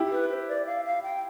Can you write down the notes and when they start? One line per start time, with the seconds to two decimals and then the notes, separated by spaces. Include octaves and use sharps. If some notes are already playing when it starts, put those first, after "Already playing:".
Already playing: E4 G4
0.12 B4
0.30 C5
0.48 D5
0.66 F5
0.85 F5
1.03 G5